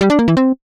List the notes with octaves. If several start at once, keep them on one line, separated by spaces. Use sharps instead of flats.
G3
D4
A#3
E3
C4